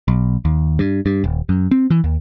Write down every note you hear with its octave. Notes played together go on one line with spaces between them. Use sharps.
B1
D#2
G2
G2
D#1
F#2
C4
E3
D#2